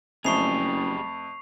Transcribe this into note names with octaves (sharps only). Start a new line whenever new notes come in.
F#1 F2 G3 A3 G#4 C#6 C7 F7